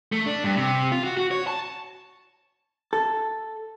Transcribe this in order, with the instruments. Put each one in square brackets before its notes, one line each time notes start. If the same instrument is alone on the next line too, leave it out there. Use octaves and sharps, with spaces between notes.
[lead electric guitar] A3
D4
G2
C3
F4
F#4
F#4
C#5
A5
[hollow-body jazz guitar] A4